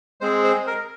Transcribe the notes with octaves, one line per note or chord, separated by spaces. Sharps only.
G#3 C4 G#4 C5
C5
A#4